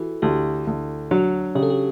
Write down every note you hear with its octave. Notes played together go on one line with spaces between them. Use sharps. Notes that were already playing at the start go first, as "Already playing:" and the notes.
Already playing: E3 F#4 G4 A4
D2 E4 G4
D2
F#3 D4 F#4
C#3 G4
A4
G4